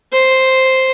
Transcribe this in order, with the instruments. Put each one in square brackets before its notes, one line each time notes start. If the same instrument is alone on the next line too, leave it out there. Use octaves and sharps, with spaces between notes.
[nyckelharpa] C5